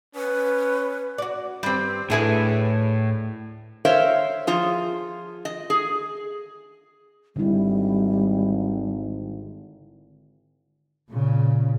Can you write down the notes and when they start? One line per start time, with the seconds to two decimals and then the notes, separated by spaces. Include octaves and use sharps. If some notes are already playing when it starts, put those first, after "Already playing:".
0.15 C#4 B4
1.18 F#4 D5
1.63 G2 G3 C4
2.10 D2 A2 D4 E4 G#4 A4 B4
3.85 A#4 C5 C#5 E5 F5
4.47 F3 F4 G#4
5.45 D#5
5.70 G#4
7.36 G#1 D3 G3 E4
11.11 A#2 C#3